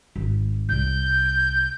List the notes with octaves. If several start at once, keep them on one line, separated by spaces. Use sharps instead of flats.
G#1
C2 G6